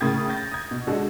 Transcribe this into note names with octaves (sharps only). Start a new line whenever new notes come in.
A2 C#3 A#3 D#6 G#6 A6
G6 A6 A#6
D#6 G#6
B2
D3 G#3 F#4 A4